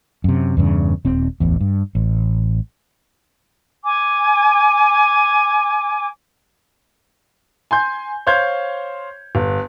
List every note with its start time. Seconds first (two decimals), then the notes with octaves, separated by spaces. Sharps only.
0.24 F#2 C3
0.57 E2 G2 C#3
1.05 D#1 C4
1.40 D1 A1 E2
1.60 G2
1.95 A1
3.84 G#5 D6
7.71 G#5 C6 G6
8.27 C5 C#5 F5 C6 G6 G#6
9.35 G1